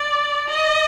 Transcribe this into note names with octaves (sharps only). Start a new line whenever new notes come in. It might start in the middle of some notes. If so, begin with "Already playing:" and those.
Already playing: D5
D#5